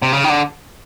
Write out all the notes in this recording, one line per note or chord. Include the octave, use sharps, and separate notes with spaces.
C3
C#3
D#3
D3